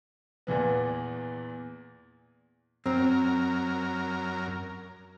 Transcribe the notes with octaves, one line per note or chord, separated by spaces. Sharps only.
E2 A#2 E3 B3
F#2 C4 A#4